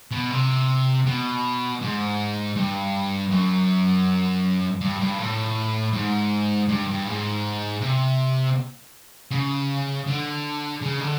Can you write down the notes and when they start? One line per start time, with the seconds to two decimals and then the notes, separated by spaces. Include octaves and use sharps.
0.11 B2
0.30 C3
1.06 B2
1.81 G#2
2.56 G2
3.30 F#2
4.81 G2
5.00 G2
5.19 A2
5.93 G#2
6.68 G2
6.88 G2
7.07 G#2
7.81 C3
9.31 C#3
10.07 D3
10.82 C#3
11.00 D3